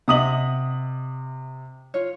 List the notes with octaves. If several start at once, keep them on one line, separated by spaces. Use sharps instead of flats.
C3 D#5 E5 F#5 D#6 F#7
F4 C#5